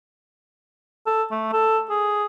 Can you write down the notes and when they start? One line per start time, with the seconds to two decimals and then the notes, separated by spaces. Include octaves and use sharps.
1.07 A4
1.31 A3
1.53 A4
1.90 G#4